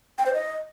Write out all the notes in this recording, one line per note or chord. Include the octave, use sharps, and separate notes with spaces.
G5
C5
D#5